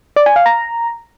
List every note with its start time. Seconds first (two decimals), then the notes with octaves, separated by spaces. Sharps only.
0.16 D5
0.26 G#5
0.36 F5
0.46 A#5